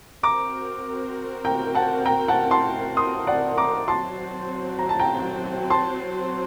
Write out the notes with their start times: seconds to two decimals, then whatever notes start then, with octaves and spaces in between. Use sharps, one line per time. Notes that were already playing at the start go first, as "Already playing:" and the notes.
0.23 C4 F#4 A#4 A#5 D6
1.45 G5 A#5
1.75 F#5 A5
2.06 G5 A#5
2.28 F#5 A5
2.51 A5 C6
2.97 C6 D#6
3.27 D5 F#5
3.58 A#5 D6
3.88 F#3 C4 F#4 C5 A5 C6
4.79 A#5
4.89 A5
4.99 G5 A#5
5.70 A5 C6